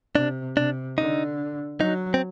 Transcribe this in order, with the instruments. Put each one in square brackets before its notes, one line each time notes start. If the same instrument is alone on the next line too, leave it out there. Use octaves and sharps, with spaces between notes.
[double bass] C3 [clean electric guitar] D4
[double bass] C3 [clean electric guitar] D4
[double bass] D3 [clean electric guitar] D#4
[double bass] F#3 [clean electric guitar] D#4
[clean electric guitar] C4